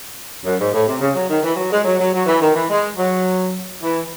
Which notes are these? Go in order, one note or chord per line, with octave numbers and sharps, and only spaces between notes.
F#2
G#2
A2
C3
C#3
F#3
D#3
E3
F#3
G#3
F#3
F#3
F#3
E3
D#3
E3
G#3
F#3
E3